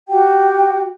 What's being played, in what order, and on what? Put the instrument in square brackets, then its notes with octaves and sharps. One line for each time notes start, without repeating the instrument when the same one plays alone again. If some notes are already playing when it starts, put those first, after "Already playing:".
[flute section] F#4 G4 F#5 G5